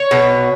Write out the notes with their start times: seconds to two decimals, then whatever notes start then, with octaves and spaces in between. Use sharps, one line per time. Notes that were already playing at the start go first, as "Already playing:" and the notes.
Already playing: C#5
0.11 B2